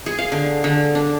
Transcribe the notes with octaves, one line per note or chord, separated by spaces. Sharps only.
G#4
F5
D3
D3
D4